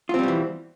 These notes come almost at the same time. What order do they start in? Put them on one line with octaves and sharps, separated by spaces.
F4 C4 G3 B2 E3